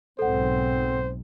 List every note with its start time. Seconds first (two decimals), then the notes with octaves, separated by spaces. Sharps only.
0.19 B1 G#2 C4 A4 C5 F#5